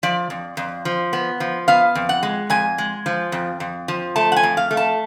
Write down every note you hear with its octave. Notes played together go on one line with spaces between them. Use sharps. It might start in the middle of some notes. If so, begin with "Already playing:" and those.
F3 D5
F2
F2
F3
B3
F3
B3 F5
F2
F#5
G#3
F2 G#5
G#3
F3
F2
F2
F3
A3 A5
F#5
G#5
F2
F5
A3
A5